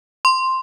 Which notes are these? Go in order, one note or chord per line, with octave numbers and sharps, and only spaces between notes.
C6